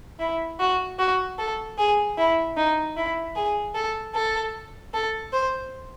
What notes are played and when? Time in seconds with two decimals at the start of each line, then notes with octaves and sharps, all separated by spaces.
0.19 E4
0.60 F#4
0.99 F#4
1.38 A4
1.78 G#4
2.18 E4
2.57 D#4
2.97 E4
3.36 G#4
3.75 A4
4.15 A4
4.94 A4
5.33 C5